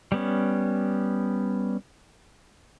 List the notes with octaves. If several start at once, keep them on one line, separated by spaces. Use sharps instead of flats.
G3 B3 C#4